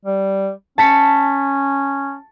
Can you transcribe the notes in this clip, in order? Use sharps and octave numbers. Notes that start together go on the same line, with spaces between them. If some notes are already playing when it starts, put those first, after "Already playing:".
G3
C#4 A5 B6 C#7